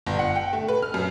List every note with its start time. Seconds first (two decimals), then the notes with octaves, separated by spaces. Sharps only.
0.06 G1
0.19 F#5
0.36 G5
0.53 A3
0.68 B4
0.83 F6
0.94 F#2